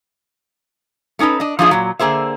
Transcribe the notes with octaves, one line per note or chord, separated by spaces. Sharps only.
A3 C#4 D#4 A4 B4
D4 D#5
F3 D4 F4 G#4 E5
A#2 F#3
D3 A#3 G#4 C5 E5